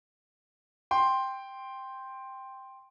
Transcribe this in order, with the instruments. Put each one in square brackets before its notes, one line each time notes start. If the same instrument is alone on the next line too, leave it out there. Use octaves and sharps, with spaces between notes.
[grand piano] G5 C6